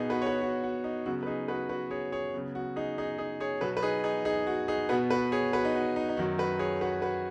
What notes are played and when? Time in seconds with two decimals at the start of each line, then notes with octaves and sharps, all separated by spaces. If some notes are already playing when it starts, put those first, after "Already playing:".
Already playing: B2 B3 D#4 G#4
0.10 F#4 B4
0.22 C#5
0.26 F#4 B4
0.42 F#4
0.64 F#4
0.84 D#4
1.06 C#3 F#3 B3 F#4
1.23 B4
1.27 D#4 G#4
1.48 F#4 B4
1.69 F#4 B4
1.91 G#4 C#5
2.12 G#4 C#5
2.34 C#3 F#3 B3
2.55 F#4
2.76 D#4 G#4
2.98 D#4 G#4
3.18 D#4 G#4
3.40 G#4 C#5
3.61 B2 F#3 B3 F#4 B4
3.77 B4
3.83 D#4 G#4
4.04 D#4 G#4
4.25 D#4 G#4
4.47 F#4
4.68 D#4 G#4
4.89 B2 B3 F#4 B4
5.11 F#4 B4
5.32 G#4 C#5
5.53 F#4 B4
5.65 D#4
5.75 F#4
5.96 D#4
6.09 D#4
6.17 F#2 D#3 F#3 F#4
6.38 F#4 B4
6.59 G#4 C#5
6.81 F#4 B4
7.02 F#4 B4